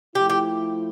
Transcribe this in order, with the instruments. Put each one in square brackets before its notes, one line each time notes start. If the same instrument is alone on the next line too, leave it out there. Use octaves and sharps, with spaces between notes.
[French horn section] F3 A3 E4 [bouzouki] G4
[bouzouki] G4